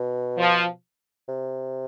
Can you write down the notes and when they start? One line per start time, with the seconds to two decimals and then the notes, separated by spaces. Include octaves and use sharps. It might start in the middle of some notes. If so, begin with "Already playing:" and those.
Already playing: B2
0.38 F3
1.29 C3